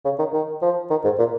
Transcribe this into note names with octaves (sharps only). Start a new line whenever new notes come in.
C#3
D#3
D#3
F3
D#3
G#2
A#2